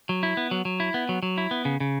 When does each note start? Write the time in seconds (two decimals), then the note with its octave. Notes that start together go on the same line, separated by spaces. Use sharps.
0.09 F#3
0.23 E4
0.37 B3
0.51 F#3
0.65 F#3
0.80 E4
0.94 B3
1.09 F#3
1.23 F#3
1.38 E4
1.51 B3
1.65 C#3
1.80 C#3